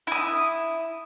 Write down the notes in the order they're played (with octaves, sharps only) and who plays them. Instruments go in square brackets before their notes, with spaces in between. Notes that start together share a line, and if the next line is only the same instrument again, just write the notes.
[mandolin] E4 D#6